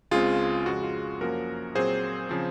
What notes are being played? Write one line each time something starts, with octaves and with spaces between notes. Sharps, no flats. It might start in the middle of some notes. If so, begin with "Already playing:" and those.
C#2 C#3 G#3 C4 F4 G#4
F2 C#3 G#3 F#4
F4
F#2 F3 A#3 C#4 F#4 A#4
A#2 F#3 C4 G#4 C5
C#3 F3 C4